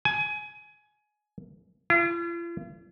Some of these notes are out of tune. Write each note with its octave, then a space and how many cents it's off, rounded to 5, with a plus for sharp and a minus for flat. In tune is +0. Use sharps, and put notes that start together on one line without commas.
G#5 +20
F4 -45